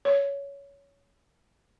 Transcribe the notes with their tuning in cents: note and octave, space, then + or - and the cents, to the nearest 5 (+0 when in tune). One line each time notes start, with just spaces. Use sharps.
C#5 +15